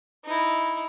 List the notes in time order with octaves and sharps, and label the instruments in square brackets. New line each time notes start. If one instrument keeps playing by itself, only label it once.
[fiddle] D#4 E4